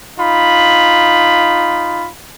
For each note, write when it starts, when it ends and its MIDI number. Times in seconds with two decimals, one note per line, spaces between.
0.19 2.09 63
0.19 2.09 65
0.19 2.09 83